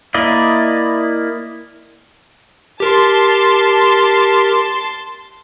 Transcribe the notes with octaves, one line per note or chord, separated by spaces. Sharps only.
A#3 E4 D5 D#5
G4 A#4 A5 C6